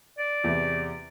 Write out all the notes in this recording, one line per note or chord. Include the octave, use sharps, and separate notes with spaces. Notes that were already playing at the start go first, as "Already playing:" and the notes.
D5
E2 C3